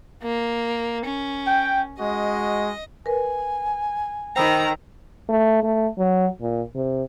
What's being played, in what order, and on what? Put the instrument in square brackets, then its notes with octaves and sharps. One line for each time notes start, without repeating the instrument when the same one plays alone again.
[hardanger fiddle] A#3
C#4
[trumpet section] G5
[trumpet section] G#3 F#4 [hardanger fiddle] D#5
[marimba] A#4 B4 [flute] G#5
[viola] D#3 A#5 [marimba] C5 B5 D#6 [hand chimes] G5 E6
[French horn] A3
A3
F#3
A#2
C3